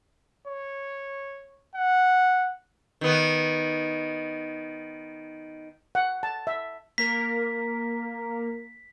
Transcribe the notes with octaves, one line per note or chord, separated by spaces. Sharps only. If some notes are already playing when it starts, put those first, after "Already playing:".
C#5
F#5
D#3 B3
F#5
A5
E5
A#3 A#4 B6